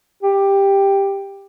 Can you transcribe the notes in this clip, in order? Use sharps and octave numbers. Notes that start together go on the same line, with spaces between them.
G4